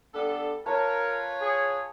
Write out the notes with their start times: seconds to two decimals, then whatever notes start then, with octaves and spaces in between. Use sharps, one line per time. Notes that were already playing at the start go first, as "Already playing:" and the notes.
0.15 G3 B3 D4 A4
0.66 F4 A#4 B4 C#5 A5 A#5
1.41 G#4